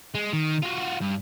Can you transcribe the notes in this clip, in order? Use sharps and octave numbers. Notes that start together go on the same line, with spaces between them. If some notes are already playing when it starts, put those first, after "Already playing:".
G#3
D#3
F4 F#4
G2